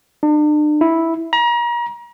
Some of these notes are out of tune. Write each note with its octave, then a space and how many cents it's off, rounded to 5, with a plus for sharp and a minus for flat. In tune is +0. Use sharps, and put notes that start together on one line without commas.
D4 +40
E4 -5
A#5 +35